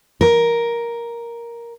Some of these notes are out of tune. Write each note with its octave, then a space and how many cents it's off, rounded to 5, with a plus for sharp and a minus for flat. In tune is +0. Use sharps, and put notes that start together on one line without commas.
A#4 +5